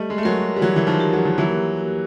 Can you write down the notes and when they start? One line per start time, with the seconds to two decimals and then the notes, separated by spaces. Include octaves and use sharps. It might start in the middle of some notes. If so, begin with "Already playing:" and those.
Already playing: G3 A3 D#5
0.10 G#3
0.18 A3
0.23 F#3 G#3 A#4
0.56 G3
0.61 E3 F#3 A#4
0.76 E3
0.87 D#3 F3
1.00 G4
1.13 F#3
1.25 F3
1.38 E3 F#3 A#3
1.78 F#4